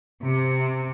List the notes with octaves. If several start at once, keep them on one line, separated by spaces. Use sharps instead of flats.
C3